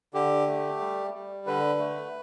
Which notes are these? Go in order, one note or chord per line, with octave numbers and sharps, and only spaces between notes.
D3 G4
A3
G3
G3
D3 B4
A3